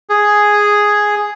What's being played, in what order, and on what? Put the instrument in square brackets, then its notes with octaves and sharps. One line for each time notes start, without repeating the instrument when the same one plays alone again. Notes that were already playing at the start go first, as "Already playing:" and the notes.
[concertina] G#4